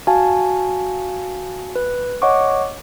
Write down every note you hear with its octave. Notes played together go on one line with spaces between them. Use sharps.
F#4 F5 G#5 A5
B4
C#5 D#5 F#5 C#6 D6